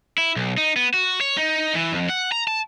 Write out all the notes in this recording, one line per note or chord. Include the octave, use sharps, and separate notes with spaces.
E4
B1
D#4
B3
F#4
C#5
D#4
E3
F2
F#5
A#5
A5